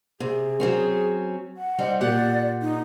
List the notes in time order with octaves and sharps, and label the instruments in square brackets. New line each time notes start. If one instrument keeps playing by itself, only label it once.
[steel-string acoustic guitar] C3 [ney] G#4
[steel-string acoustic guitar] F#3 C4 C#4
[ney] F#5
[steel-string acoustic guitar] G3 C4 D#4
[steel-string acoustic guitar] A#2 G4 F#5 [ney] D5
[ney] D#4